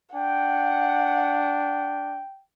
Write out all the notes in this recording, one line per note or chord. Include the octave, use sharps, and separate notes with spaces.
D4 F#5 G5